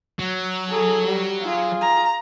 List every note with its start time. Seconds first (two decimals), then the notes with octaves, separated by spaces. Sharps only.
0.19 F#3
0.68 G#4 A4
1.06 G3
1.41 F4 G#4
1.81 A#5